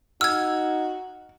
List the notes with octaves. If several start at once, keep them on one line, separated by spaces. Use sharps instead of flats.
D#4 F#4 E6 F6 G#6